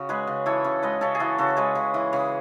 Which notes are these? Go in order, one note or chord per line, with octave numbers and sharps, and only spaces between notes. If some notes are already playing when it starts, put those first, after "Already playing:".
Already playing: C#3 F#4
G#3 G#4 B4
C#3
E3 A4 C#5
C#3
G#3 B4 D#5
C#3 A4 C#5
G#4
E3 F#4 A4
C#3 F#4 A4
G#3 G#4 B4
C#3
E3
C#3